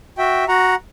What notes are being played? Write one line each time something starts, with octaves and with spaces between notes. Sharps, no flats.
F#4 E5 G5
F#4 F#5 A#5